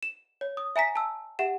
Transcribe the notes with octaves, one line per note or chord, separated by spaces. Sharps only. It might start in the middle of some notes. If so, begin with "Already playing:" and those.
E7
C#5
D#6
E5 G#5 A#5 B6
A5 E6
G4 E5 F#5 E7